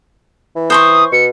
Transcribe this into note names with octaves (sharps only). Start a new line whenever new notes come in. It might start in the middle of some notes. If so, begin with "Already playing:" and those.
E3
C5 C6 C#6 D#6
B2 C#7